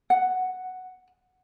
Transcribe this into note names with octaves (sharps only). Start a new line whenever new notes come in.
F#5